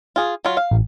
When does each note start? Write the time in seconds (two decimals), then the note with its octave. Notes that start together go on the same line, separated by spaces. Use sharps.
0.16 F4 G#4
0.45 F#3 F4
0.57 F5
0.71 A1